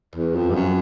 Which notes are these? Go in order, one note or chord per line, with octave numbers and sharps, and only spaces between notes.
E2
F2
G2
F#2